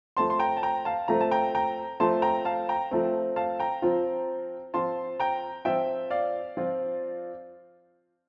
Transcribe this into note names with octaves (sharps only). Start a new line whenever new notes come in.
F3 A3 C4 A5 C6
C6
G5 A#5
A5
G5 A#5
F5 A5
F3 A3 C4 A#5
A5
G5 A#5
G5 A#5
F3 A3 C4 A5 C6
G5 A#5
F5 A5
G5 A#5
F3 A3 C4
F5 A5
G5 A#5
F3 C4 F4
F3 C4 F4 A5 C6
G5 A#5
F3 C4 F4 E5 G5
D5 F5
F3 C4 F4